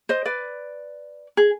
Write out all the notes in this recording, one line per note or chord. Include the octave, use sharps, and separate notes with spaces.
C5 D#5
B4 D5
G#4